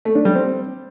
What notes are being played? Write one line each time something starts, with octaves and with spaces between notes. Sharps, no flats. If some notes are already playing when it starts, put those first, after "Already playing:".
A3
D4
G3
C4